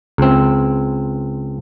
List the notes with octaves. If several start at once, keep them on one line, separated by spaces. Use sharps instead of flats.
C#2 C4